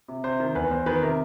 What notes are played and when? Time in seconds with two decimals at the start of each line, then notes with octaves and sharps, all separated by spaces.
0.08 C3
0.24 C3 C5
0.40 D#3
0.55 E2 B4
0.71 E2 C5
0.86 D#3 B4
1.03 C3 A#4